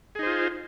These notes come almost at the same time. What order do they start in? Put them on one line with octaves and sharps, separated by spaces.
G#4 D#4 C5 F4